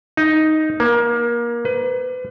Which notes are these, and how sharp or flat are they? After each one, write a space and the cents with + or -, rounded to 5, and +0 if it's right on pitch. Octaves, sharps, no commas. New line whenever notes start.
D#4 +5
A#3 +25
B4 +35